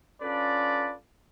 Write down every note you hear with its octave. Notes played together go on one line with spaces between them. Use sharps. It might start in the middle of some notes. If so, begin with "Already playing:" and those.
C#4 D4 F4 A4 B4 D5